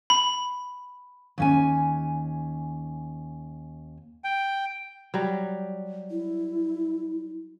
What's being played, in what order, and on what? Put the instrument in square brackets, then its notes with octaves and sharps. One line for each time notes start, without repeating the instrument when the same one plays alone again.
[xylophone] B5
[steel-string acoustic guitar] D#2 C#4 G#5
[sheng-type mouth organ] G5
[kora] F#3 G3
[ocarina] E4